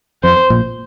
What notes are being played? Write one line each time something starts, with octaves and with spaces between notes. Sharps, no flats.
F2 C5
A#1 A#2